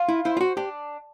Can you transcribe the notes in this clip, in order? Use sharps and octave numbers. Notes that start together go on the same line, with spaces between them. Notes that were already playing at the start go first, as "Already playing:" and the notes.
Already playing: F4
E4
E4 C5
F4
F#4
D4 G4